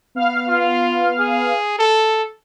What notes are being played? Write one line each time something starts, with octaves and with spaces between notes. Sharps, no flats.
B3 F5 F6
F4
G#4
A4